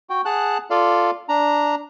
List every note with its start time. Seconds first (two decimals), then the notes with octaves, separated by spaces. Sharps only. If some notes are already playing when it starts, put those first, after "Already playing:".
0.10 F#4 G5
0.25 G#4 F#5 A5 F#6
0.70 F4 A4 D5 F5
1.29 D4 A#5